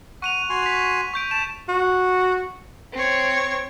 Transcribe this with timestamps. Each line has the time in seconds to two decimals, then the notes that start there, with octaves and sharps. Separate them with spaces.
0.22 F#5 C#6 D#7 F7
0.50 F#4 G#5 C6
0.63 B6 F7
1.14 C#6 G6 D7
1.31 A5 E7
1.69 F#4
2.94 C4 C#5